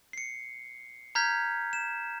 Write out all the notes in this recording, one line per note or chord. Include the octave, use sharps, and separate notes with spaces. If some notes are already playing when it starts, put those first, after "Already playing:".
C7 C#7
A#5 F6 G6 G#6 B6
E7